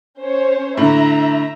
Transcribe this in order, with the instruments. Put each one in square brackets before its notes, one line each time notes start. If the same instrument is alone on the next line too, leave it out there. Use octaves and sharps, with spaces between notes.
[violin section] C#4 C5 C#5
[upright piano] A2 D3 [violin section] E5 A#5